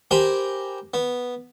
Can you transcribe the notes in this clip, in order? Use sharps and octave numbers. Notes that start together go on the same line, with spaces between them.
G4 A#4 C5 G#5 A#5 B5
B3